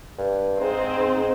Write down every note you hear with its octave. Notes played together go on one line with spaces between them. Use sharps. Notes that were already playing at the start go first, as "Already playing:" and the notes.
G2
G#2 C4 D#4 G#4 C5